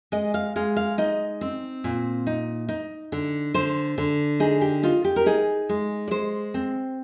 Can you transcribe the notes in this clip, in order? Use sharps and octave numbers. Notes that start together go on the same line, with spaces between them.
G#3 D#5
F5
G#3 F5
F5
D#4 D#5
C4
A#2
D#4
D#4
D3
D3 C5
D3
D#4 G#4
G4
D#4 F4
G4
A#4
D#4 G#4
G#3
D5
G#3 C5
C4